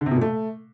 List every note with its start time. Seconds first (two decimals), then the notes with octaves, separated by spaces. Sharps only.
0.01 D3
0.06 C3
0.11 B2
0.16 A#2
0.21 A3